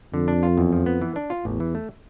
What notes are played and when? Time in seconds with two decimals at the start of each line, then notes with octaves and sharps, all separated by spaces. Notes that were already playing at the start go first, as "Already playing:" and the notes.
0.13 F2 D3
0.28 D4
0.43 F4
0.58 E2
0.72 F3
0.86 B3
1.02 E3
1.16 D4
1.30 F4
1.45 A1 E2
1.60 E3
1.75 A3